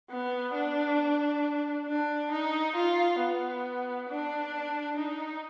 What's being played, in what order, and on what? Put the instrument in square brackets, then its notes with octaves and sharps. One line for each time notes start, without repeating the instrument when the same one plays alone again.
[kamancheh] B3
D4
D4
D#4
F4
B3
D4
D#4